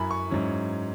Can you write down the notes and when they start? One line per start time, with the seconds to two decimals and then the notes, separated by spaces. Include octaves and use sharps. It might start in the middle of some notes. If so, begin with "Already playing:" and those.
Already playing: F#2 F#3 E4 G#5 B5
0.11 C#6
0.29 G#2 F#3 C#4 E4